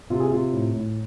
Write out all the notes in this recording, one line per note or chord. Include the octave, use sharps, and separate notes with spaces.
C3 F4
G#4
C3 F4
A2
A2